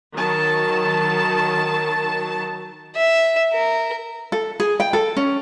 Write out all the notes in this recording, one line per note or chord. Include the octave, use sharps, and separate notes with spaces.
D#3 F#3 A5
E5
A#4
A4
G#4
G5
A4
C#4